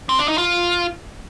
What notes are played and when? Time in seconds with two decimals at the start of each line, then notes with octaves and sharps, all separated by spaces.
0.09 C4
0.19 D4
0.28 D#4
0.38 F4